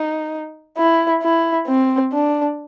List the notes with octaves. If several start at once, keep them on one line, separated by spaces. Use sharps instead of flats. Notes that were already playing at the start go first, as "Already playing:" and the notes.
Already playing: D#4
E4
E4
C4
D4